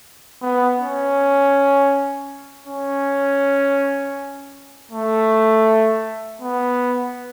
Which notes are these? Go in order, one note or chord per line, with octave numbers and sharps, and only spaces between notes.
B3
C#4
C#4
A3
B3